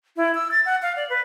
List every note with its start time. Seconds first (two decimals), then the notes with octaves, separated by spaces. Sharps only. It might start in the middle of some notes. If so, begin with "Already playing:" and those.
0.17 E4
0.35 E6
0.51 A6
0.66 F#5
0.82 F5
0.96 D5
1.09 B4